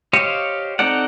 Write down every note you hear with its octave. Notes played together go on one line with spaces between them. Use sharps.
G4 C5 C#5 D#5 F5
C4 D#4 A4 D5 F#5